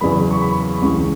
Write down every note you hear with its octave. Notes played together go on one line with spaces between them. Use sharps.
E2 C#3 F#3 B3 B5
C#6
B5
C#2 C#3 E3 C#6